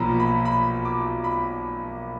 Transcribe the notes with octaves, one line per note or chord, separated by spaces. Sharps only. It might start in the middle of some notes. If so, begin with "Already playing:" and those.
Already playing: B1 A#2 F3 A#5 B5
B5
B5
D6
B5